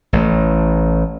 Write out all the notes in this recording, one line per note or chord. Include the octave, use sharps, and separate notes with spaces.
A1 A2